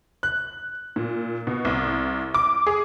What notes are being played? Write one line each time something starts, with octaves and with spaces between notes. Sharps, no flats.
F#6
A#2
B2
C2
D6
G#4